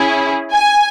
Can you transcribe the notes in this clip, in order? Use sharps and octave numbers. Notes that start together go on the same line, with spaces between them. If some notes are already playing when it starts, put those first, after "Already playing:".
Already playing: C#4 E4 G#4
G#5